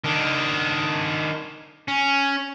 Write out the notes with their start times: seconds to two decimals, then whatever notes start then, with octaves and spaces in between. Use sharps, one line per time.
0.04 D#3 D4
1.88 C#4